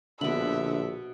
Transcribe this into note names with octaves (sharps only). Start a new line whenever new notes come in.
A#1 B2 D3 E5 B5